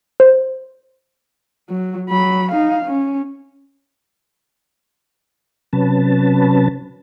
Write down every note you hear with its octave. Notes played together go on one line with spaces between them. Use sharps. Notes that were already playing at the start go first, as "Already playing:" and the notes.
C5
F#3
F#3 B5
D#4 F5
C#4
C3 F#3 C#4 B4 A5